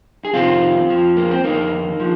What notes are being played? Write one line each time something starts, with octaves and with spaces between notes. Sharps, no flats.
G#4
F2 C3 D#3 C4 F4
F2 F3
A#3
C4
F2 D#3 A#3 D#4
F3